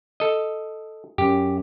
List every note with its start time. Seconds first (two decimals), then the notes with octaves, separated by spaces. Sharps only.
0.20 A4 D#5
1.18 F#2 G4